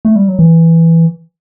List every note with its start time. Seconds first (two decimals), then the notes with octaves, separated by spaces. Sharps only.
0.05 A3
0.16 G3
0.28 F#3
0.39 E3